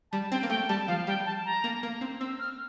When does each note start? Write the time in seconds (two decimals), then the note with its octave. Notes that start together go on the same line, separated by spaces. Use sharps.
0.12 G3 A5
0.31 C4 G5
0.43 A#3
0.49 A3 G5
0.68 G3 A5
0.87 F3 F5
1.07 G3 G5
1.26 A5
1.45 A#5
1.64 A#3
1.83 A#3
2.01 C4
2.20 C4 E6
2.40 F6